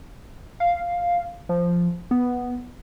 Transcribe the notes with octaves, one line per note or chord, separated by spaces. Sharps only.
F5
F3
B3